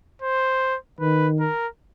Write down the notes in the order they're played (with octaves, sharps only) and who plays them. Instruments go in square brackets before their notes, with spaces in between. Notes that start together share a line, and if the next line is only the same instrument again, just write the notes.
[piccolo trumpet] C5
[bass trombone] D#3 [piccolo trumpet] B4
[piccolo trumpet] A#4